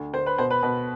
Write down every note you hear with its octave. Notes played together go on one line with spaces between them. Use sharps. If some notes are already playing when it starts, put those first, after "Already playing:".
Already playing: D2
D2 C5
B4
B2 C5
B4
B2 B4